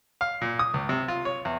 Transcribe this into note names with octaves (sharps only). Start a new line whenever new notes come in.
F5
A#2
D#6
C#2
C3
F4
C#5
E2